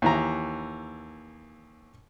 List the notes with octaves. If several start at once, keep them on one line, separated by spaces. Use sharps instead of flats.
D#2 E3 A#5